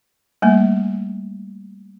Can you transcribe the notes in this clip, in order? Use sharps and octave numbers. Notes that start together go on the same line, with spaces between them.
G3 A3 A#3